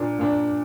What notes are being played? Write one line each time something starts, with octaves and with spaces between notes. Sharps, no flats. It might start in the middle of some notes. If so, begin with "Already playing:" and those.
Already playing: A#2 A#3 D4
A#2 A#3 D4